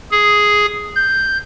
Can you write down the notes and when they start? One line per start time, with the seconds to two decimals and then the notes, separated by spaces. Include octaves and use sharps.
0.11 G#4
0.96 G6